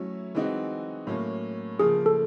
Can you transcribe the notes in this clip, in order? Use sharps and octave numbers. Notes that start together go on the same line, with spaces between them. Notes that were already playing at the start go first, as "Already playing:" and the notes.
Already playing: F#3 A3 C#4 E4 A4
E3 G#3 C4 D#4 F#4
A2 F#3 A#3 C#4
C#3 F3 A#3 G#4
A4